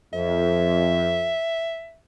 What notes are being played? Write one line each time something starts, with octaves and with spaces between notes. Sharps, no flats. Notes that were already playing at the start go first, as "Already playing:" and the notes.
F2 E5